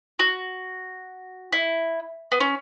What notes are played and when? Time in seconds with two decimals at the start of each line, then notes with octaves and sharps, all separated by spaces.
0.19 F#4
1.52 E4
2.32 B3
2.40 C#4